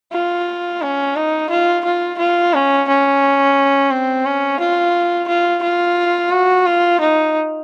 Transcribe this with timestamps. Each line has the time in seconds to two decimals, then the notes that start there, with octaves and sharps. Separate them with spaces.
0.12 F4
0.81 C#4
1.16 D#4
1.49 F4
1.84 F4
2.18 F4
2.54 C#4
2.88 C#4
3.91 C4
4.26 C#4
4.60 F4
5.28 F4
5.63 F4
6.32 F#4
6.66 F4
7.00 D#4